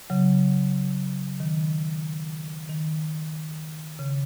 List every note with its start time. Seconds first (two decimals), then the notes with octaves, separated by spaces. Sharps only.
0.10 C#3 F#3
1.40 D#3
2.69 D#3
3.99 C#3